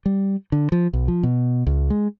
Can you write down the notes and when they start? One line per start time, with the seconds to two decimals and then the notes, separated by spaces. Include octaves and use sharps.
0.06 G3
0.52 D3
0.72 F3
0.93 B1
1.08 F3
1.23 B2
1.67 C#2
1.90 G#3